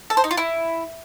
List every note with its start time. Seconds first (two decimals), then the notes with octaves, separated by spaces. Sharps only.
0.10 A4
0.17 C5
0.24 D#4
0.31 F4
0.37 E4